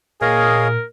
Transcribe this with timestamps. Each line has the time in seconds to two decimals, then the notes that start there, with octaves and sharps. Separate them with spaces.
0.21 A#2 G#4 A#4 C#5 D#5 F5